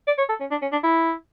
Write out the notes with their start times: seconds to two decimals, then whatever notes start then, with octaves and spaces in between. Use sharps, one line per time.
0.08 D5
0.18 C#5
0.29 A4
0.40 C#4
0.51 D4
0.62 C#4
0.72 D4
0.84 E4